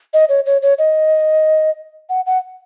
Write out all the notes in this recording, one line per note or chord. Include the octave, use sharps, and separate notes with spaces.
D#5
C#5
C#5
C#5
D#5
F#5
F#5